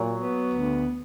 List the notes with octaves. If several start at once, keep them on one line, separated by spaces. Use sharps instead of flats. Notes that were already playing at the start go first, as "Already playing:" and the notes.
Already playing: A#2 F#3
B3
D2